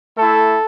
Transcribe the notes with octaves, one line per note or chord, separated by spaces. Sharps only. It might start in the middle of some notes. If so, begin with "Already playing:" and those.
A3 E4 A4